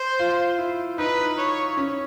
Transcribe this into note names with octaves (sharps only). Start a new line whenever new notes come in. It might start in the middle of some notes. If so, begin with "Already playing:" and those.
Already playing: C5
F4
E4
D#4 B4
C#5
C#4